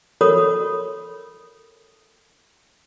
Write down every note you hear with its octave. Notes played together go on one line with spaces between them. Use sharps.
F#4 A4 A#4 C#5 B5 D#6